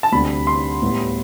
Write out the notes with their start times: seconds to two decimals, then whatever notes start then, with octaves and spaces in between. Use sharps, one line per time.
0.03 A5
0.12 D2 C3 G3 D4 G4 B5
0.47 C6
0.82 A2 G3 B3